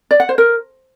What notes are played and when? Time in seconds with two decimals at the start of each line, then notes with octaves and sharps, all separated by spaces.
0.11 D5
0.20 F#5
0.29 C5
0.38 A#4